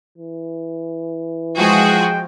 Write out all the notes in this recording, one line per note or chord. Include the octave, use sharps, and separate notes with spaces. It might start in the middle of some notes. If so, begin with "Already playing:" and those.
E3
F3 G#3 F#4 G#4 G5